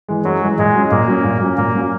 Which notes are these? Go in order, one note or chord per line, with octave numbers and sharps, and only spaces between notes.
E3 G#3
F#2 F#3
E3 G#3
A#2 G#3
F#3 C#4
A#2 A#3
F#3 C#4
A#2
F#3 C#4
A#2 A#3
F#3 C#4